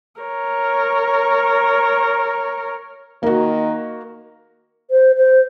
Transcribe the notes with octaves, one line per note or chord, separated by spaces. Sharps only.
A#4 C#5
D#3 A#3 F#4
C5
C5